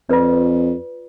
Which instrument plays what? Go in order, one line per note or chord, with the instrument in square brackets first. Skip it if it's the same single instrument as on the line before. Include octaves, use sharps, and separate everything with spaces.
[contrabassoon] F2 [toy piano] F4 B4 D5